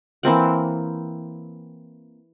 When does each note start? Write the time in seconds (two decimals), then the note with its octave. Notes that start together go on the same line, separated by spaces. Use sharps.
0.23 E3 A#3 C4 F#5